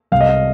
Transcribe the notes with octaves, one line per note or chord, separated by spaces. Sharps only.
C2 F5
D#5
F5